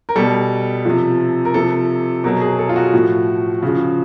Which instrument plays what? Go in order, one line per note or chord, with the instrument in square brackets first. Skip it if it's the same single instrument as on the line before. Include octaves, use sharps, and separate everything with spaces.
[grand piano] A#4
B2 G3 A4
C3 F3
A#4
C3 F3 A4
B2 F#3 A#4
G#4
A4
F4
F#4
A2 F3
C#3 F3